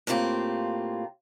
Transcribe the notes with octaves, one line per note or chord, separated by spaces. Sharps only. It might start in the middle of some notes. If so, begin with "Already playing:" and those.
A2 A#3 C4 F4 G4